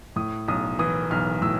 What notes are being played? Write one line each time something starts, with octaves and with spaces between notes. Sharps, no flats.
A2 D#6
B1 D#6
E3 D#6
B1 F6
A2 E6